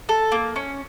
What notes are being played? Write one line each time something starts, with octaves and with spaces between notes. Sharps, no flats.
A4
A#3
C#4